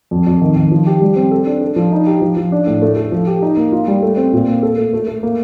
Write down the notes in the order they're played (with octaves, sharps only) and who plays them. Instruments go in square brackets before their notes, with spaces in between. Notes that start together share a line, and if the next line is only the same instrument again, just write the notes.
[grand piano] F2
F2
D#3
D#3
F3
G4
G3
C4
A4
D4
A4
F3
D#4
G4
F3
F3
D4
A2
A3
A4
F3
G4
D#4
A#3
F4
G3
A3
C4
A#2
A#3
A4
A3
A3
A3
A#3